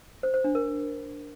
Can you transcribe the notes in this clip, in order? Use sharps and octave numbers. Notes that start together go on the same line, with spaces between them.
C5
C5
D4
A#4